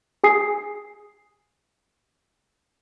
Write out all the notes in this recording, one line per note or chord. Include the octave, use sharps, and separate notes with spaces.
G#4 G#5 D#6 C7